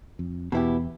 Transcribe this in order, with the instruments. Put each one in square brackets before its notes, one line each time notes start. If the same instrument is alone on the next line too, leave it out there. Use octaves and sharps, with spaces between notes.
[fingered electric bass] F2
[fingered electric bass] E2 [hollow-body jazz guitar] B2 B3 E4 G4